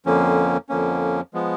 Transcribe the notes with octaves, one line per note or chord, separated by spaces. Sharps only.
F2 D3 F3 A#3 C#4
F2 D3 F3 A#3 C#4
F3 G#3 B3